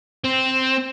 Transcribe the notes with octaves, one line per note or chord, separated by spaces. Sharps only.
C4